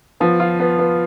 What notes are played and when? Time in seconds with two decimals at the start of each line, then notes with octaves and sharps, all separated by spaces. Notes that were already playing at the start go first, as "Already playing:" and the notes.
0.20 F3 B3
0.40 F4
0.60 B3
0.79 B3